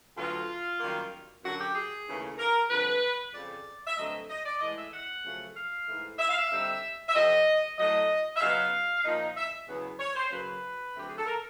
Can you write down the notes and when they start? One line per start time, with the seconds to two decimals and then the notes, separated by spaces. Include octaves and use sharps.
0.16 D2 D3 F#3 B3 F4
0.80 F#2 D#3 G3 A#3
1.43 F#2 D3 F#3 F#4
1.60 G4
1.75 G#4
2.06 D#2 C#3 E3 A3
2.38 A#4
2.70 F2 D3 G3 B4
3.33 F2 C#3 F3 D5
3.87 E5
3.97 G2 D3 F#3 A3 C4 D#5
4.29 D#5
4.45 D5
4.61 A2 E3 G#3 D#5
4.76 E5
4.93 F#5
5.24 F#2 C#3 F3 A3
5.56 F5
5.88 G#2 E3 A3
6.19 E5
6.29 F5
6.37 E5
6.51 D3 G3 C4 D#4
7.09 E5
7.14 F2 C3 F3 D#5
7.78 A2 F#3 A3 D#5
8.36 E5
8.41 C#3 F#3 B3 D#4 F5
9.05 A#2 F3 A#3 D#4
9.37 E5
9.68 E2 C#3 F#3 B3
9.99 C#5
10.15 C5
10.31 F#2 C#3 F#3 A#3 B4
10.96 D2 D3 F#3 A3 C4 G4
11.09 G#4
11.18 A4
11.26 A#4